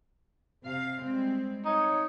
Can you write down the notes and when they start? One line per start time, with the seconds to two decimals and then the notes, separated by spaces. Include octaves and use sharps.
0.63 C3 F5
1.03 G3 G#3 C4
1.65 D#4 C#5